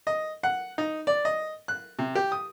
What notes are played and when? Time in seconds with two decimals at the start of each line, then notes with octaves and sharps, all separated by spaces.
0.07 D#5
0.43 F#5
0.78 D#4
1.07 D5
1.25 D#5
1.68 F#6
1.99 C3
2.15 G4
2.32 D#6